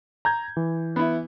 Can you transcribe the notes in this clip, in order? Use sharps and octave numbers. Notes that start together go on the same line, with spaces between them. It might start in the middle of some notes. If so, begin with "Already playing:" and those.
A#5 G6 G#6
E3
B3 E4